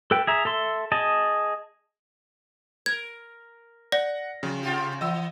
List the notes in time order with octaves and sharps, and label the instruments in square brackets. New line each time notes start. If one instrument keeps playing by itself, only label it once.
[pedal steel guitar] A4 B4 G5
G#4 E5 A#5
A4 E5 C6
G#4 D#5 A5
[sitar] A#4 [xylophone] G#6
[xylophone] D5 [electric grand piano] F#5 A#6
[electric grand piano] C#3 [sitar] F3
[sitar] C3 F4 G4
[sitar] E3 [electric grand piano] D#5 E6